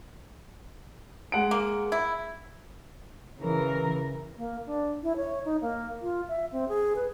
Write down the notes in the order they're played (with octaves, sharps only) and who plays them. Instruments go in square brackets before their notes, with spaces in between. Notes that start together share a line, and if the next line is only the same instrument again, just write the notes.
[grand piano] G#3 F#5 D7
[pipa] A#3
E4
[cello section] C#3 E3 A#4
[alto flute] A#3
D4
E4
C#5
D#4
A#3
F4
E5
C4
G#4
B4